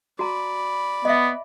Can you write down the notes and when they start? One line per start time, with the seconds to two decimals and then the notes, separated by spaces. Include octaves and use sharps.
0.19 F#4 D5 A#5 B5
1.05 B3 D#5 E5